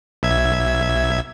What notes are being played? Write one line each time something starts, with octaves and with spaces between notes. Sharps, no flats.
B1 E5 G#6